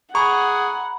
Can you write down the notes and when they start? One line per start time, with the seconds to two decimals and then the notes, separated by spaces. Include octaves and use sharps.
0.15 G#4 F#5 A#5 B5 C#6